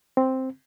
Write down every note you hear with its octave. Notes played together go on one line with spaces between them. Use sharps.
C4